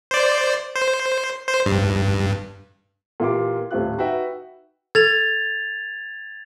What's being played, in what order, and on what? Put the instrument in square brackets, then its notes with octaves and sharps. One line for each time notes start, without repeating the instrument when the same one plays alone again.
[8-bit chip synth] C5 D5
C5
C5
G2
[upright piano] A#2 E3 F4 G4 C6 D6
D#1 A2 C4 F4 G4 F#6
D#4 F#4 B4 E5 G5
[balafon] A4 [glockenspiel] G#6 A6 F7